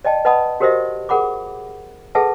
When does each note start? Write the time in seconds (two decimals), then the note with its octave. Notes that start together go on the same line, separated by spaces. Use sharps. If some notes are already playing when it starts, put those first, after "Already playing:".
0.05 D5 D#5 G5 A5
0.25 B4 D#5 F#5 A5 B5 D#6
0.60 F#4 G4 A#4 C5 D#5 E5
1.09 G#4 A#4 F#5 B5 D6
2.15 G#4 A4 B4 E5 F#5 A5